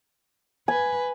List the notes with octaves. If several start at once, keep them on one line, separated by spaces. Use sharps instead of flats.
B4 G#5